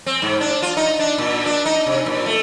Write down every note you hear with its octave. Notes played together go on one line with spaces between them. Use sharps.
C4
G#2
D4
F4
D#4
D4
A#2
D4
D#4
C3
A#2
A3